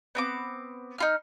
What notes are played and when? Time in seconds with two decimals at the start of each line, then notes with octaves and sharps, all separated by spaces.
0.15 B3 C4 D6
0.98 D#4 F4 F6